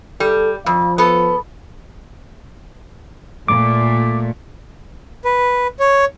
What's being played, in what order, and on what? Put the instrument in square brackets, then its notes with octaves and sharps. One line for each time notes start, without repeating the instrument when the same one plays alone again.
[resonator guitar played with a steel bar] G3 [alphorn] A4
[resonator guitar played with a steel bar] F2 [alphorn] F3
[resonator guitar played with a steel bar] B3 A4
[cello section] A#2 A3 [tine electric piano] D6
[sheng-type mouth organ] B4
C#5